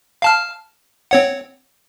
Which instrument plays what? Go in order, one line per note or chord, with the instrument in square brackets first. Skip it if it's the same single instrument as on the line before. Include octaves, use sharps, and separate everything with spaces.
[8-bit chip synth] F5 A5 F6
C4 C#5 F#5